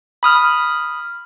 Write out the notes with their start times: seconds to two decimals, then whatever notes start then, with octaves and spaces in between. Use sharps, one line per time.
0.23 B5 D#6 F6